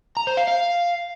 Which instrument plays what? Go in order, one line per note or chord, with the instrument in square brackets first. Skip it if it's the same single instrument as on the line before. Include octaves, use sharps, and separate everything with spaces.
[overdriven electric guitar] A#5
C5
F5
F5